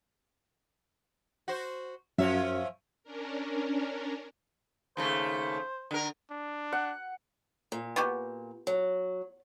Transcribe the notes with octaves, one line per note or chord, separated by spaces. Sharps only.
F#4 C5
F#2 F3 F#3 C#4 E5
C#4 D4 A#4
D#2 C#3 A3 C5
D3 A#4
D4
F#5
A#2
B3 F#4 G4
F#3